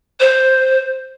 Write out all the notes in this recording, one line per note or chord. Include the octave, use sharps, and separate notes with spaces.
C5